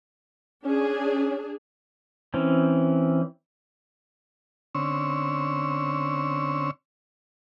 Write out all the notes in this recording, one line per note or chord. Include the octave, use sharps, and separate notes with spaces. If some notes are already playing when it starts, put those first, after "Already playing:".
C#4 D4 G#4
E3 C4 C#4
D3 C4 C#4 C#5 E6